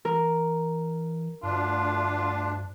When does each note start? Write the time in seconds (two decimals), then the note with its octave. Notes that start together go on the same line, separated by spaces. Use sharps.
0.05 E3 A#4
1.43 D2 G2 D4 F4